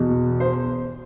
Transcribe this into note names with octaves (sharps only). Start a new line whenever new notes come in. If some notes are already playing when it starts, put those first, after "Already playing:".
Already playing: E2 B2
C5